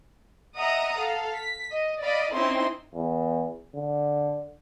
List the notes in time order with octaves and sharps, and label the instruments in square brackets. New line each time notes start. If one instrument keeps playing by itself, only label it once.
[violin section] D#5 E5 F#5 A#5 D#6
A4 F5
B6
D#5
D5 D#5 F5 B5
C4 C#4 D#4 E4 C6
[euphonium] E2
D3